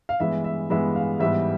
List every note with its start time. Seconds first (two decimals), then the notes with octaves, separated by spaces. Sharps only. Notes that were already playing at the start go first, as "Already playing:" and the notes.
0.09 F5
0.20 G2 E3 G#3 B3 E5
0.44 E5
0.70 G2 E3 G#3 B3 E5
0.96 F5
1.20 G#2 E3 G3 B3 E5